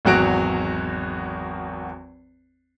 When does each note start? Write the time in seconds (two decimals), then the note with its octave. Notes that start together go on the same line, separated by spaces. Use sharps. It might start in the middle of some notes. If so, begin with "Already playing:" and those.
0.05 G#1 E2 F#3 F#4 D7